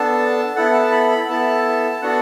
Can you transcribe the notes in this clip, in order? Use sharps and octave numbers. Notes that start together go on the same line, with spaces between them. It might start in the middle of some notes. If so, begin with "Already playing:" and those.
Already playing: B3 D4 A4 A5
B3 E4 A4 F#5
A5
B5
B5
B3 E4 A4 A5
B3 D4 F#4 A4 F#5